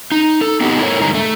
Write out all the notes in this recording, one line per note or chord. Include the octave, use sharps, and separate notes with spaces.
D#4
A4
B3 C4 D#4 F#4 G4
E4 A4 A#4 C5 C#5
G2 D3 G3 G#3 D#4 A#5
A3